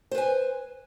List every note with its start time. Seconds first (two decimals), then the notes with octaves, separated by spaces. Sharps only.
0.11 C5
0.15 B4
0.18 G#5